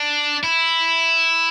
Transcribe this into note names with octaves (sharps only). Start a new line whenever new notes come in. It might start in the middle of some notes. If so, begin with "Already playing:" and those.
Already playing: D4
E4